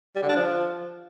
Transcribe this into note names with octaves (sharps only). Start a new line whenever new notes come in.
G3
D3
D4
F3